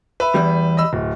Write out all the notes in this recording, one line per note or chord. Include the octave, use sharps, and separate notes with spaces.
B4 E5
E2 G3
D#5 B5 E6
D1